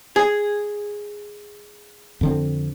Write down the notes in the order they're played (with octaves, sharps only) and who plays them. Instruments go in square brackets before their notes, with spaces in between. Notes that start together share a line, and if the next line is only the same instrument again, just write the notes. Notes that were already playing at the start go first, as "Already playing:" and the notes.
[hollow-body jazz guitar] G#4
[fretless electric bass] F2 D3 C4